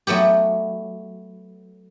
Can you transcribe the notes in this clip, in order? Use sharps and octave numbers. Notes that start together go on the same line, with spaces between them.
F#3 A3 B3 G4